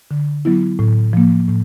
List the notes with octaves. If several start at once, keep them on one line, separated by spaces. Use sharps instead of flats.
D3
F#3 B3 E4
A2
F3 A#3
A2